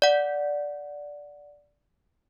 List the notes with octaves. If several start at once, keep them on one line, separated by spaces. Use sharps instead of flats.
D5 F#5